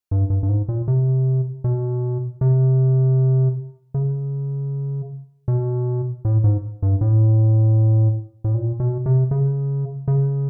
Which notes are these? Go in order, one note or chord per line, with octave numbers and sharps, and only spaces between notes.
G2
G2
G2
G#2
A#2
C3
B2
C3
C#3
B2
A2
G#2
G2
A2
A2
A#2
B2
C3
C#3
C#3